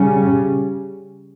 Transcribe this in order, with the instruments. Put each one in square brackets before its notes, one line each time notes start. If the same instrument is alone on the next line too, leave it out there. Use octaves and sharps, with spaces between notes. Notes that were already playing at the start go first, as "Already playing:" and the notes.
Already playing: [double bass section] C#3 G3 C#4